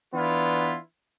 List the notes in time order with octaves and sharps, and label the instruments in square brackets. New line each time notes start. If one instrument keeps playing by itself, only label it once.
[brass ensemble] E3 B3 D4 E4 F4